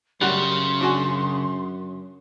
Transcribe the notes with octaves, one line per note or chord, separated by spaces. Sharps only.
F#2 C#3 G3 F#5 C6 F#6
D4 F#4 G#5